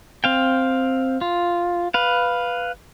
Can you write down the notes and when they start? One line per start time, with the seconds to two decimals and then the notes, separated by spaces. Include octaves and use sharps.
0.24 C4 F5 G5
1.21 F4
1.94 B4 F5